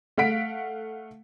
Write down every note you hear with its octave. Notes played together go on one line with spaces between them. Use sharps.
A3 F5 F#5 B6 D7